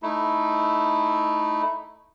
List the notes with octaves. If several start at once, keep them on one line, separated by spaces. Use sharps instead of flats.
A3 D#4 E4